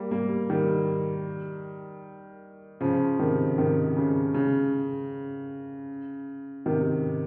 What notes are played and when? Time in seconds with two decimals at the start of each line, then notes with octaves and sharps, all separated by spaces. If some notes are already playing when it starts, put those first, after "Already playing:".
Already playing: G3 A#3
0.11 G3 A#3
0.50 D#3 G3
2.81 C#3 F3
3.19 C3 D#3
3.58 C3 D#3
3.96 C#3
4.34 C#3
6.66 C3 D#3